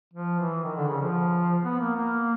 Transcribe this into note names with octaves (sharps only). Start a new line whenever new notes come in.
F3
E3
D#3
D3
C#3
F3
B3
A#3
A#3